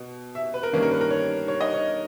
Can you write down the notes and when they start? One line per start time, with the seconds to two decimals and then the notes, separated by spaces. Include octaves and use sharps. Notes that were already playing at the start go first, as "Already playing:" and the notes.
Already playing: B2
0.35 E5
0.54 B4
0.63 A#4
0.73 G2 D#3 A#3 C#4 B4
0.83 A#4
0.92 B4
1.01 A#4
1.11 C#5
1.48 C#5
1.61 D#5
1.74 C#5